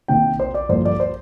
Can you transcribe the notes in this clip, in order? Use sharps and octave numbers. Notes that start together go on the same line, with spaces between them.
C3 D#3 A#3 G5
C5
D5
G2 D3 F3 A#3 C5
D5
C5